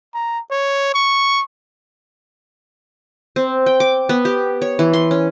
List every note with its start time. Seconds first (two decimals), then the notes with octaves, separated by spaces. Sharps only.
0.14 A#5
0.51 C#5
0.94 C#6
3.36 C4
3.66 G5
3.80 D6
4.09 B3
4.25 G4
4.62 C#5
4.79 E3
4.93 C6
5.11 C#4